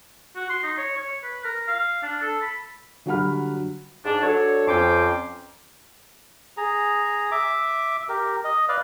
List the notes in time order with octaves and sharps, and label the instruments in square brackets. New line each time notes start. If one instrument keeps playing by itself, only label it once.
[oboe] F#4
C6
D#4
C#5
C#5
B4
A#4
F5
D4
A4
B5
[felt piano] D3 F#3 G3 F#5 B5 F6
[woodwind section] G#2 D4
F#3 D4 A4 C#5
F2 C4 C#4 G5 C6 D6
[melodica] G#4 A#5
E5 D6
G4 A#4
D#5
B4 D5 F5